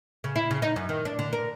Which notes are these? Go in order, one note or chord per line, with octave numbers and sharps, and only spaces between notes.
C#3
E4
C#3
D#4
F#2
D#3
D4
D3
A#4